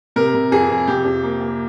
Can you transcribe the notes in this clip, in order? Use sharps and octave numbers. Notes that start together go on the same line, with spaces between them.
C3 A#4
C3
F2 G#4
F2
C3 G4
F2
A#3
A#3